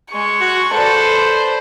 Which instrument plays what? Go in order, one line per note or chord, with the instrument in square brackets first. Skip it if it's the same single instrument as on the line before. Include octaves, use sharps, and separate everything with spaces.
[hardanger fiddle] G#3 [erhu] C#6
[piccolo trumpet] F#4
[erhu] A4 [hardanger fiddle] B4 D5 [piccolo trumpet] C5